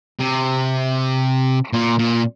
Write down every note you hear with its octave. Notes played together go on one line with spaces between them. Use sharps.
C3
A#2
A#2